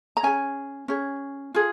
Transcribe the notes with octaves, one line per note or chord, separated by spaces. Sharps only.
A#5
C#4 G#4 G#5
C#4 G#4
F4 G#4